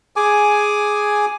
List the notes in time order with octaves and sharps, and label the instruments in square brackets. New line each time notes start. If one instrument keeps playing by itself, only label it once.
[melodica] G#4 G#5 D6